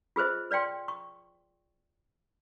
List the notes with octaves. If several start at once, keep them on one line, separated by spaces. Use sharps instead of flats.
F4 G#4 B4 C5 D#5
B4 D5 F5 G5 C6
C#6